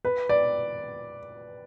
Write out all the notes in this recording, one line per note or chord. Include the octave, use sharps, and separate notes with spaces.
B4
D5